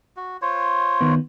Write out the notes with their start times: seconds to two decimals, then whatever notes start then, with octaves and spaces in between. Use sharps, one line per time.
0.17 F#4
0.42 F4 C5 C#5
1.01 D#3 B3